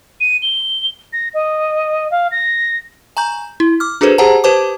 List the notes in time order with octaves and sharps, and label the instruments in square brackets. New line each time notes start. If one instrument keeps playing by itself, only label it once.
[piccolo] D#7
G7
A#6
D#5
F5
A#6
[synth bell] G#5 A#5 C#6 G6
E4
D6 F6
D4 F#4 G#4 A4 B4 C5
G4 G#4 C5 F#5 A5 A#5
G4 B4 C5 A5 D6